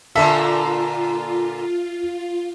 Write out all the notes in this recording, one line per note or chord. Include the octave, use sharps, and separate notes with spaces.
A#2 D3 A#3 F4 A4 E5